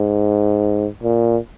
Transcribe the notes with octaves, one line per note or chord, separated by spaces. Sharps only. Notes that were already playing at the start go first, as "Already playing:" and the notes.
Already playing: G#2
A#2